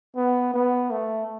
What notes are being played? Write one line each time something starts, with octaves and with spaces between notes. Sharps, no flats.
B3
B3
A3